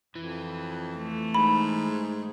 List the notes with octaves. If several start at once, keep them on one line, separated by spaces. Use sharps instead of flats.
F2 E3
A3
G#2 B5